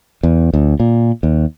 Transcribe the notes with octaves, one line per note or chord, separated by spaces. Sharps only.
E2
D2
A#2
D#2